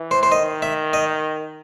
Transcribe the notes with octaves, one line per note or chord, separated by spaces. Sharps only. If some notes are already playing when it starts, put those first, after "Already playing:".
Already playing: E3
C5
C5
D#3 D#5
E5
D#5